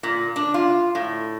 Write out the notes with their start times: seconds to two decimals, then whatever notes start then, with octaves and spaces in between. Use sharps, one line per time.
0.03 A#2
0.36 D4
0.54 F4
0.95 A2